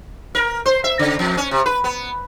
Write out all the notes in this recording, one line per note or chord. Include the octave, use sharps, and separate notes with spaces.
A#4
C5
E5
C#3
F2
C#4
C3
B4
B3